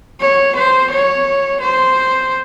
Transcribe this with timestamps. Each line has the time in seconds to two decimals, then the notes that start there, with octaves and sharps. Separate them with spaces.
0.20 C#5
0.56 C5
0.91 C#5
1.60 C5